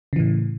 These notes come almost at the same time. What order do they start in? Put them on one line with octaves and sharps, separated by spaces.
C#3 E3 A2